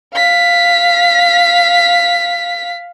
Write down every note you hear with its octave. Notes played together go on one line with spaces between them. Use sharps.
F5 B6